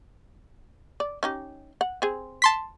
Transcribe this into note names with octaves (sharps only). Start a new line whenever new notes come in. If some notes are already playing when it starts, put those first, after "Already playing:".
D5
C#4 D#4 G4
F#5
C4 G#4
A5 C6 B6